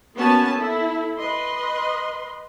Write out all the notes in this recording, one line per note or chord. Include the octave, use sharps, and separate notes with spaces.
A#3 B3 C#4 F#4 G#5 A5
E4 A4
B4 D#5 C6